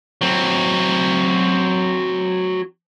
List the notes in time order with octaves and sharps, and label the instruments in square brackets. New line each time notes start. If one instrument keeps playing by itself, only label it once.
[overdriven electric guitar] F#3 C4